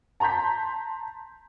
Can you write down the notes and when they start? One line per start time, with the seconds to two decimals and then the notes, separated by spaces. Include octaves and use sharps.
0.20 A5 A#5 C6 G6 B6